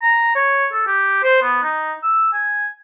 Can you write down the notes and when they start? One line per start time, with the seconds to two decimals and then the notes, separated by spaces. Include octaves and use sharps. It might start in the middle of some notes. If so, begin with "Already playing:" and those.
0.02 A#5
0.35 C#5
0.72 A4
0.87 G4
1.23 C5
1.42 B3
1.63 D#4
2.03 E6
2.33 G#5